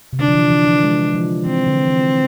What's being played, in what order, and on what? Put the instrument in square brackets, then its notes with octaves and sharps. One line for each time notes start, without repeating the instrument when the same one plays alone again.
[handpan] C3
[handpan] D3 [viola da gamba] D4
[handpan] F3
E3
E3
F3
G#3
F3
[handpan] E3 [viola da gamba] C4
[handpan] D3
E3